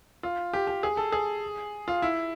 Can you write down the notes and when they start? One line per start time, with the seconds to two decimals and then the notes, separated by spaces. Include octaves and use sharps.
0.23 F4
0.53 G4
0.67 G4
0.83 G#4
0.97 A4
1.12 G#4
1.88 F4
2.02 E4